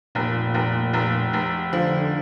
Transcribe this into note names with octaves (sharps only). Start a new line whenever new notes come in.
F1 A#2
F1
F1
F1
D3 F3